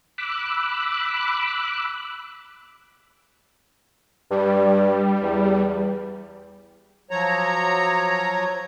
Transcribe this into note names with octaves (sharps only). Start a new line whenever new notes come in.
B5 D6 E6 F#6
G2 G3
E2
F3 F#3 C#5 A#5